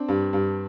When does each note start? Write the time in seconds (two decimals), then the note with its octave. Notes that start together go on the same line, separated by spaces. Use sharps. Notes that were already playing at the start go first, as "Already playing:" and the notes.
Already playing: C4 D4
0.08 G2
0.33 G2